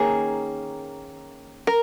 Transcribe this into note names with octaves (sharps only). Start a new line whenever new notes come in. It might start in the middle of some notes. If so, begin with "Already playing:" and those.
Already playing: D#3 A#3 C#4 G#4
A#4